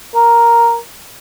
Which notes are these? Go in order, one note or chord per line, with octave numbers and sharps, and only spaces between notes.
A#4